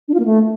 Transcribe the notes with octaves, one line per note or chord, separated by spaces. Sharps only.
D4
F4
A#3
A3